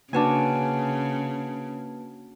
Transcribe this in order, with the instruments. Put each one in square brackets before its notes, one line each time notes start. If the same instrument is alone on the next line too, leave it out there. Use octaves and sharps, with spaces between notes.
[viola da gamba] C#3 [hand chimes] A#3 B4 A5 [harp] D4 F#4 G#5